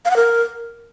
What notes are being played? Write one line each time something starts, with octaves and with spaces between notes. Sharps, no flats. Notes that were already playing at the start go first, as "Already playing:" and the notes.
F5
F#5
A#4